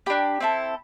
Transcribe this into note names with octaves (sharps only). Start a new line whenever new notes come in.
D4 G4 B5
C4 E4 A4